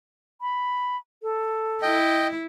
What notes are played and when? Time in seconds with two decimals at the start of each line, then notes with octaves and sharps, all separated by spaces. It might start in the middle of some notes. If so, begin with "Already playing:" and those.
0.41 B5
1.23 A4
1.82 E4 D#5 G5